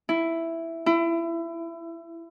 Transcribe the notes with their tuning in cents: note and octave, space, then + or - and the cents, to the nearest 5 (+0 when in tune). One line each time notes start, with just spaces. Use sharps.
E4 +5
E4 +25